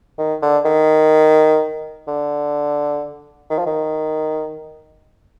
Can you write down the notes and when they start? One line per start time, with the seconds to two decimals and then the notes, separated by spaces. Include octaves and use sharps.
0.19 D#3
0.42 D3
0.65 D#3
2.08 D3
3.50 D#3
3.59 F3
3.67 D#3